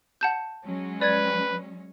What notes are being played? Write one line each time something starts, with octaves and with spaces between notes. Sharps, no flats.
F#5 A5 G6
F#3 G#3 C#4
B4 D5 G#6